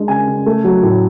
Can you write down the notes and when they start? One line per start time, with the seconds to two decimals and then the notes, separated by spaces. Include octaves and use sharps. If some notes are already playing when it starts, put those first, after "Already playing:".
Already playing: G#3 D4
0.08 C#3 G#5
0.28 C#3
0.46 A3
0.64 F#3
0.83 A2